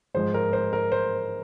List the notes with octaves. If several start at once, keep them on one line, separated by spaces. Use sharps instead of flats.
G#2 F3 G#3 C5
A#4
C5
A#4
C5